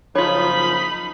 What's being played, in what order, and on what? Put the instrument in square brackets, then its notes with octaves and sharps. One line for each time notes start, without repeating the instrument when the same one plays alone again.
[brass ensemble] F#1 F3 [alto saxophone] D#4 [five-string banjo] F4 C#5 [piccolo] B5